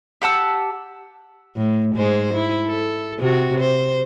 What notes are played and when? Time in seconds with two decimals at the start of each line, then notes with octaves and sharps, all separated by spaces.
0.22 G4 F#5 A5 E6
1.56 A2
1.96 G#2 G#3 C5
2.34 E4
2.66 A4
3.20 C3 F#4
3.60 C5